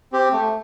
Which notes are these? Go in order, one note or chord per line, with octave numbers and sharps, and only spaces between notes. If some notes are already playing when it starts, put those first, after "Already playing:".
C4 G4
A3